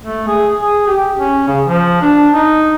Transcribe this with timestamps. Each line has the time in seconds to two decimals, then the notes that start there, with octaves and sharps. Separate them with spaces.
0.03 A3
0.28 G#4
0.60 G#4
0.87 G4
1.17 C#4
1.48 C#3
1.67 F3
2.02 D4
2.34 D#4